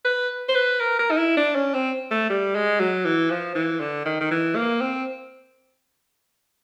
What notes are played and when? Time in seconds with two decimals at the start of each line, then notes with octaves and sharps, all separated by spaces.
0.05 B4
0.49 C5
0.55 B4
0.80 A#4
0.99 A#4
1.11 D#4
1.18 E4
1.37 D4
1.56 C#4
1.74 C4
2.11 A3
2.30 G3
2.55 G#3
2.80 F#3
3.05 E3
3.31 F3
3.55 E3
3.80 D3
4.05 D#3
4.20 D#3
4.31 E3
4.56 A#3
4.81 C4